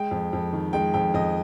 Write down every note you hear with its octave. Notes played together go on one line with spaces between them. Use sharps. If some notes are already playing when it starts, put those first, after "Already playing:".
Already playing: G#3 G5
F2
F2
D#3
G#3 G5
F2 G5
F2 D#5